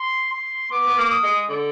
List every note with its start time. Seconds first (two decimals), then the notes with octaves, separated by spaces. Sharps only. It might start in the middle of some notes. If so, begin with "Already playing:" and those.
Already playing: C6
0.33 C6
0.72 B3 D6
0.87 B3
0.98 A#3
1.11 D#6
1.24 G#3
1.50 D3